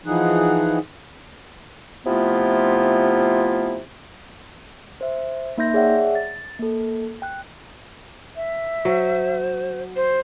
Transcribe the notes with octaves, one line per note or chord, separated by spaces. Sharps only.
E3 F3 D#4 G#4 F#5
C3 F3 A3 B3 E4 F4
C5 E5
A#3 D#4 E5 C6 G6 A#6
G#4 C#5 D5 E5 F#5 G5
A6
A#3 A4
G5 F#6
E5
F#3 C5
C5